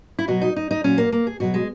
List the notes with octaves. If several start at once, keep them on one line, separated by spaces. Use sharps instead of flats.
E4
B2 F#3 F#4
D#4
D#4
D#4
A#2 F#3 C#4
A#3
A#3
G#4
B2 F#3 F#4
G#3